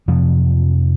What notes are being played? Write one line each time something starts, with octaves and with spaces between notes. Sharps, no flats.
F2 C3 F3 F#3